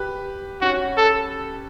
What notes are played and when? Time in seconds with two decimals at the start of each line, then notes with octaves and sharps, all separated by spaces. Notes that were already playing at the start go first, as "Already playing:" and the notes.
Already playing: G4 B4
0.61 C#4 F#4
0.98 A4